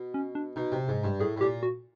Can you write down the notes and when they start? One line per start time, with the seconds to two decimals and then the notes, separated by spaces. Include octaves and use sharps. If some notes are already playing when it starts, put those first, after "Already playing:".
Already playing: B2
0.14 C#4
0.35 D4
0.56 B2 D#4
0.72 C3
0.88 G#2
1.04 G2
1.20 A2 G#4
1.36 A2
1.41 A#2 G4
1.63 F#4